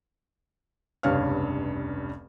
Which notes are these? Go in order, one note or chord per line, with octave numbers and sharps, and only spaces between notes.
F1 C#2 G2 C#5 F5 F6